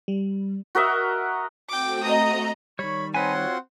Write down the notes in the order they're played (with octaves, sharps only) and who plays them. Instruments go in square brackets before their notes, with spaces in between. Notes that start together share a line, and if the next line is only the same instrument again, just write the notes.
[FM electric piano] G3
[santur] F#4 A#4 D#5 E5
[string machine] A3 C4 F#4 [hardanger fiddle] G5 D6
[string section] D#5 A#5 [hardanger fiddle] D#6
[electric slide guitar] D#3 G3 [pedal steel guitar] C#5 [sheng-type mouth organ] B5 [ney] C#6
[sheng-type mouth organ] C4 F#5 C6 [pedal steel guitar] D#4 B4 G#5 [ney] C#5
[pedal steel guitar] F4 F#4